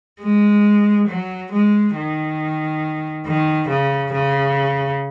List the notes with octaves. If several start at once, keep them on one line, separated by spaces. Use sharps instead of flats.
G#3
F#3
G#3
D#3
D#3
C#3
C#3